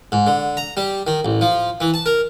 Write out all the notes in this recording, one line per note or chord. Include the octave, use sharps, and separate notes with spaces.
G#2
D3
A#5
G3
D#3
A1
F3
E3
A5
A#4